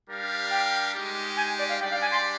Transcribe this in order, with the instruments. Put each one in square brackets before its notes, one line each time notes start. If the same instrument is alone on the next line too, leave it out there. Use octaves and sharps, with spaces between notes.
[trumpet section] G3 D4 G4 A#4 F5
[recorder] G5
[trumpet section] G#3 D#4 G4
[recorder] G#5
D5
F5
[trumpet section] G3 D4 G4 D5 [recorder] G5
[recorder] F5
G#5
C6